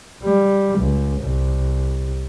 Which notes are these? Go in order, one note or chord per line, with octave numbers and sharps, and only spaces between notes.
G3
C#2
C2